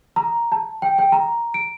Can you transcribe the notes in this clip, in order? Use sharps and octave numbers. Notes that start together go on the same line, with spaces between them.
A#5
A5
G5
G5
A#5
D7